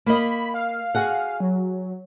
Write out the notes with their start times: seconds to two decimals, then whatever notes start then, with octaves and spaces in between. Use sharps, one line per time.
0.06 A#3 D#5 B5
0.54 F5
0.95 F#4 G#4 F#5
1.40 F#3